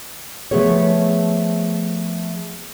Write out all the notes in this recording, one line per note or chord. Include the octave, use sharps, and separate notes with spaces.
F3 A3 B3 G#4 C#5